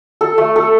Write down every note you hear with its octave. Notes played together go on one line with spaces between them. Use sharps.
A4
A3
A4